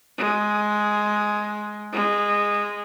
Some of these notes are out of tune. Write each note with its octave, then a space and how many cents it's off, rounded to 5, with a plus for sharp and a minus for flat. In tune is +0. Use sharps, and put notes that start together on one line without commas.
G#3 +10
G#3 -15